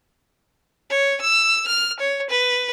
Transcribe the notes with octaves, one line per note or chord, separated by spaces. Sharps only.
C#5
E6
F6
C#5
B4